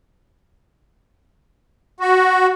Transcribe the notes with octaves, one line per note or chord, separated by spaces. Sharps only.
F#4